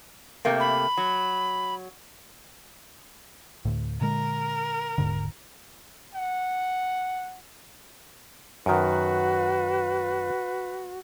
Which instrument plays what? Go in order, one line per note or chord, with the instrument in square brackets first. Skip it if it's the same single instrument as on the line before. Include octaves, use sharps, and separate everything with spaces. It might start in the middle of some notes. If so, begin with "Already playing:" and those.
[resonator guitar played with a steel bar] C3 A3 A#3
[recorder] B5
[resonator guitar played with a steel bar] F#3
[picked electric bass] D2 A2
[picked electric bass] A#2 D3 G#3 [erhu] A#4
[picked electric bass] D#1 G#2 D3
[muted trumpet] F#5
[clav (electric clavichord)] F#2 D#3 [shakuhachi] F#4 [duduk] B4